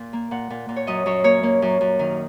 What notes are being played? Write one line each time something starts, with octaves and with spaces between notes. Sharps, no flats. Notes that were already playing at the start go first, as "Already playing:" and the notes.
Already playing: A#2
A#3
A#2 F#5
A#2
A#2
C#5
F#2 D#5
F#2 C#5
A#3 C#5
A#3
F#2
F#2
D#3